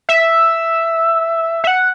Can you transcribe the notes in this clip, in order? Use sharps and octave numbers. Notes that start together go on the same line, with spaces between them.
E5
E5
F#5